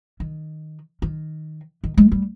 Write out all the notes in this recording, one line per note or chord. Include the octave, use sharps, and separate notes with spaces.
D#3
D#3
D#3
G#3
G3